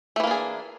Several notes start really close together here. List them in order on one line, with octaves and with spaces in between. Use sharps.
A3 E3 A#3 D4 G#4